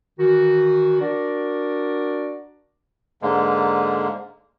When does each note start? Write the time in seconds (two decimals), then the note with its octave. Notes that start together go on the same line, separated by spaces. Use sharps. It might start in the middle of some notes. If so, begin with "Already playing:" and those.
0.19 D#3 E3 F#4
1.00 D4 F#4 A#4 D5
3.22 G#2 D3 G#3 A#3